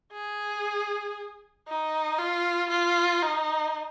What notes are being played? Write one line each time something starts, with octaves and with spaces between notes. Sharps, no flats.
G#4
D#4
F4
F4
D#4